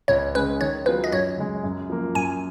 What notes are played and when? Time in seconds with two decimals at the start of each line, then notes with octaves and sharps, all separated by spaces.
0.08 C#2 C#5
0.34 C#3 G#3 C#4 B4
0.60 D#3 C#5
0.86 F#3 B3 F4 G#4 B4
1.04 D#5
1.12 F#2 C#5
1.38 C#3 G#3
1.64 F#2
1.90 F3 A#3
2.15 F#2 G#5